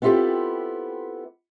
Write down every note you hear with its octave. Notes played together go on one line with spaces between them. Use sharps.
B3 C4 E4 F4 G4 A4